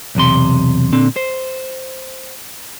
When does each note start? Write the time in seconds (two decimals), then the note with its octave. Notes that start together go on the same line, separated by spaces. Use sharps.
0.15 B1 E2 C3 C6
0.92 A#2 D3 C4
1.16 C5